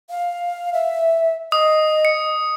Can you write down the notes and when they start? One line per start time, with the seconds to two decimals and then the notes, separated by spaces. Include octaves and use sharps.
0.10 F5
0.73 E5
1.52 D#5 D#6
2.05 C#7